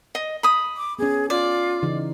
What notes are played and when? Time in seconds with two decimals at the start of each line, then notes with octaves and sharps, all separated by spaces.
0.15 D#5
0.43 B5 D#6
0.77 D6
0.99 B3 C#4 G#4
1.30 F4 D5
1.83 C#3 E3 D#4